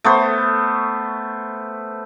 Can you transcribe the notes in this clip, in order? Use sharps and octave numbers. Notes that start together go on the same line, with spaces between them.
A3 B3 C5